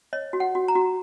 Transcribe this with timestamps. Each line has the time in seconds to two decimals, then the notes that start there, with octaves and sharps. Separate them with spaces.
0.13 C#5 D#5
0.33 F#4
0.40 F#5
0.55 F#4
0.68 A#5
0.75 F#4